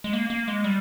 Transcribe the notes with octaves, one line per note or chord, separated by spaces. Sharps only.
G#3
A#3
A#3
G#3
G3